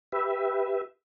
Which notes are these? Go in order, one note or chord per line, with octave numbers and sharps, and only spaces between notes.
G4 B4 E5